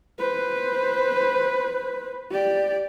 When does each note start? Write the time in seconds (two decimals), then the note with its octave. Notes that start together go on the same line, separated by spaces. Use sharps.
0.19 B4 C5
2.31 G4 D5